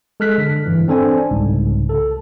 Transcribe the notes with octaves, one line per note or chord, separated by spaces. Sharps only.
G#3 A4 F6 F#6 B6
D3
G2 E3
C4 D4 A4 C5 D5 G#5
C2 G#2 C#3
A4